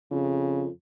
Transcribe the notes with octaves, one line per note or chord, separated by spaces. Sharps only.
F2 C#3